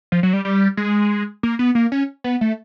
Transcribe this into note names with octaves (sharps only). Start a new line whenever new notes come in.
F3
F#3
G3
G3
G#3
A#3
B3
A#3
C#4
B3
A3